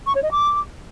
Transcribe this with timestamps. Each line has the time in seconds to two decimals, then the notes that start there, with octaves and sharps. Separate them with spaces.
0.07 C#6
0.15 C#5
0.24 D#5
0.32 D6